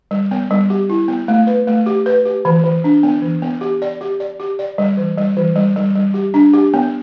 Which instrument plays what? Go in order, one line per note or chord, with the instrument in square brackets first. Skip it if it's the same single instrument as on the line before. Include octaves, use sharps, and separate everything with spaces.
[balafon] G3
B3
G3
G4
E4
B3
A3
B4
A3
G4
B4
G4
E3
E3
D4
B3
E3
B3
G4
D5
G4
D5
G4
D5
G3
E3
G3
E3
G3
G3
G3
G4
D4
G4
B3